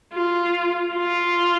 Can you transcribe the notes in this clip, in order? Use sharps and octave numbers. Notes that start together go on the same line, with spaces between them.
F4
F4